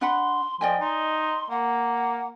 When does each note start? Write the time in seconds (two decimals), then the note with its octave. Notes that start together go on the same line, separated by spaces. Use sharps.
0.01 D4 F#5 B5 C6
0.61 F3 D5 D#5 G5 G#5
0.80 D#4 C6
1.50 A#3 F#5